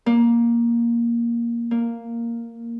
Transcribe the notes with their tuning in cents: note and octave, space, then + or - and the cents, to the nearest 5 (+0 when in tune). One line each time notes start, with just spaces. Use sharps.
A#3 +10
A#3 -5